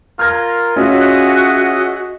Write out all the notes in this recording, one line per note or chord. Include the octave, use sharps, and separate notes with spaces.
F4 A#4 F6 G#6 A#6
C#4 F4 F#4 G#4 D#5 E5